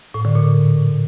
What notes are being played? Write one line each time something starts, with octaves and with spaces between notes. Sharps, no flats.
A2
D3
A#2